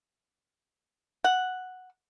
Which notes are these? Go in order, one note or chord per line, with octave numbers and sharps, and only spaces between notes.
F#5